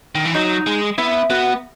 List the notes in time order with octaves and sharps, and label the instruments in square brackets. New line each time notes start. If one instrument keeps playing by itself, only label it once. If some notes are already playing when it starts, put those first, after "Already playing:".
[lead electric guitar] D#3
E3
[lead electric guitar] F#3 [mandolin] D#4
[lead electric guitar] G#3
[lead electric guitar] B3 [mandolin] E4
[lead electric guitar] B3 [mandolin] F#4